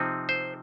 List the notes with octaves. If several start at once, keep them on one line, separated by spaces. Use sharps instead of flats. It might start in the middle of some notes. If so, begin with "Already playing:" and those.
Already playing: C3 F3 C4 D#4
C5